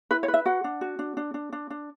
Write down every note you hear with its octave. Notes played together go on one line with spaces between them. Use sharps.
E4 B4
C#5
B4
E5
F#4 F#5
D4
F#4
D4
D4
D4
D4
D4